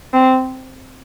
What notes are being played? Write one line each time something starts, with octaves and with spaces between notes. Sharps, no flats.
C4